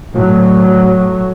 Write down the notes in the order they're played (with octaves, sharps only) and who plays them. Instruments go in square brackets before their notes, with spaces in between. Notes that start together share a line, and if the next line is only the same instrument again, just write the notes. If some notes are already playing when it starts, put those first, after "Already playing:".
[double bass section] A2 F#3